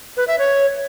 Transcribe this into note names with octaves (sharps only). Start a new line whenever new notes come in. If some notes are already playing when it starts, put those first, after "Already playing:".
B4
E5
C#5